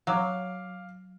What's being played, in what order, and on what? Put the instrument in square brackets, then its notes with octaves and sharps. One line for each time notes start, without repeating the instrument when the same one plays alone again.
[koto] F#3 [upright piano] F5 D6